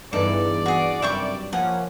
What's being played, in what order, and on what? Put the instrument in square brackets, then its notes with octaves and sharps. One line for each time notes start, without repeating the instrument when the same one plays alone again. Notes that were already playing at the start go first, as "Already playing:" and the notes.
[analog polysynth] E2 E3 [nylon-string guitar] G2 D#4 [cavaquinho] A4 [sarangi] D5
[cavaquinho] F#4 G#4
[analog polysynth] F#2 C3 G3 [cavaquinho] E5 G5 C#6
[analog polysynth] F3 A#3 C#4 [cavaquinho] F#5